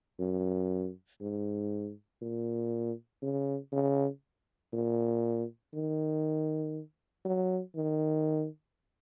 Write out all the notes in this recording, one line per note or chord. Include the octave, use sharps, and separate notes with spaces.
F#2
G#2
A#2
C#3
C#3
A#2
D#3
F#3
D#3